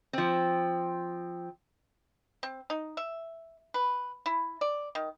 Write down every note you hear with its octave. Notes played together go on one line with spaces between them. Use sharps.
F3 C4
C4
D#4
E5
B4
E4
D5
D#3